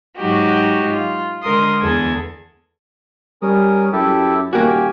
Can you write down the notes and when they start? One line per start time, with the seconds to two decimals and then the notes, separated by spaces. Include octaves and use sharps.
0.17 G#2 F#3 D#4 F#4 G4
0.91 F4
1.42 D3 G#3 A#4 C6 D#6
1.81 E2 G#4 A4 G#6
3.42 G3 C#4 A#4 D#6
3.92 F#2 E4 G4 A4
4.53 D#1 A#3 F#4 G4 G#5